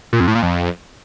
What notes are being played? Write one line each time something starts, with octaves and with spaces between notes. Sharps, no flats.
A#2
F2
A2
A#2
F2